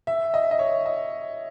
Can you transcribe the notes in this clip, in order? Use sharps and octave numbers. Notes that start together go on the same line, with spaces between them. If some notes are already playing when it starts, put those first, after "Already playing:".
E5
D#5
D#5
C#5
D#5